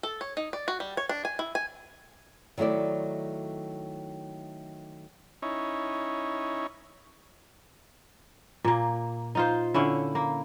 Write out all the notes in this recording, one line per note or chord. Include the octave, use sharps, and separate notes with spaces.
A4
C#5
D#4
D5
F#4
G3
C#5
D4
G#5
E4
G#5
D#3 F#3 A3 E4 D5
C#4 D#4 E4 C#5
A#2 A#3
D#4 F4 C5
D3 C#4 E4
A#3